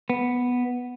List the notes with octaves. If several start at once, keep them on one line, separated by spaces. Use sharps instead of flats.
B3